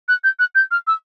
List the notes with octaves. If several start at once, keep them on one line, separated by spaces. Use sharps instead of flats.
F#6
G6
F#6
G6
F6
E6